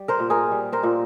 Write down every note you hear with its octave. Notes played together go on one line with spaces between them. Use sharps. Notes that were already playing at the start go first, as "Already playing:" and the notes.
Already playing: G3
A#4 C5
A#2
G#4 A#4
G3
A#4 C5
A#2